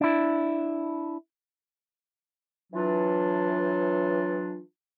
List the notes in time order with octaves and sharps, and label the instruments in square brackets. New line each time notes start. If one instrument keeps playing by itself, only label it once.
[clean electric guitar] D4 E4
[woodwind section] E3 F#3 D4 F4